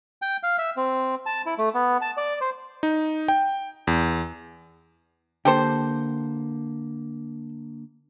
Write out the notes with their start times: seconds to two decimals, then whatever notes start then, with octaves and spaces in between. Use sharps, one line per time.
0.22 G5
0.43 F5
0.58 E5
0.77 C4
1.26 A5
1.46 E4
1.58 A3
1.74 B3
2.02 A5
2.17 D5
2.41 C5
2.83 D#4
3.28 G5
3.87 E2
5.45 D3 A#3 G4 A4 C5